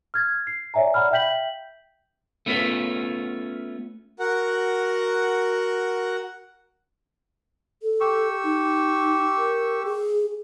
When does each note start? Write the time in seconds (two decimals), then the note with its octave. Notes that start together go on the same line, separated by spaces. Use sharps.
0.14 F6 G#6 A6
0.47 C7
0.74 C#5 D5 E5 G#5 A#5
0.94 D5 F#5 A#5 B5 F6
1.11 E5 F5 G5 G6 B6 F#7
2.46 A3 B3 C#4 F4 B4
4.20 F#4 A#4 F#5
7.82 A4
8.00 G4 C#6 E6
8.44 D#4
9.37 A#4
9.84 G#4